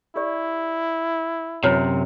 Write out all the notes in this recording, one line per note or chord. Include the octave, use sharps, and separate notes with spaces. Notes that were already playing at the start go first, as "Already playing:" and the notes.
E4 G4 D5
F#2 C3 F4 B4 C#5